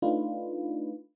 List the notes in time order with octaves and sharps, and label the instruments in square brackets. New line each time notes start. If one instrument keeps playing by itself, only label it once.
[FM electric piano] A3 D4 D#4 F4 B4